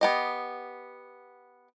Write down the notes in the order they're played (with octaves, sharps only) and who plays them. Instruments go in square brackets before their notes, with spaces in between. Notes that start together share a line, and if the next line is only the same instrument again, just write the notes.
[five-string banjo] B3 G4 D#5